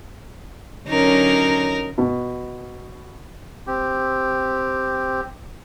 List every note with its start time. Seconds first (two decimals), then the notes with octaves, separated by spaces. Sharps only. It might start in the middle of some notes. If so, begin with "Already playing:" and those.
0.88 D3 F#3 C#4 D#4 A#4
1.98 B2
3.67 C4 G4